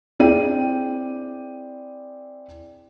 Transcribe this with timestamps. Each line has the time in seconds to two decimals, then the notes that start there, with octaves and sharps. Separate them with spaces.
0.19 C4 E4 G#4 D5 G5 D#7